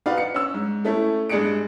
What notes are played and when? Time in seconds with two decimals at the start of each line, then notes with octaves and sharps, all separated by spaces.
0.06 D#4 F#4 B4 D5 F5
0.18 C#7
0.34 C#4 E6
0.54 G#2
0.84 A3 C#4 E4 A4
1.29 G2 G#3 D4 G#4 C#7 D7